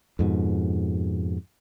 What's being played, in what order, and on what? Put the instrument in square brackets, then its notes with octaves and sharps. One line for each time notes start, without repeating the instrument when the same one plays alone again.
[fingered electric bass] F2 G#2 B2